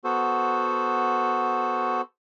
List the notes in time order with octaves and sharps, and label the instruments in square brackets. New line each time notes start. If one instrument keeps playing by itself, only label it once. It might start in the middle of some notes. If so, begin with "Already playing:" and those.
[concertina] B3 F#4 A4 C5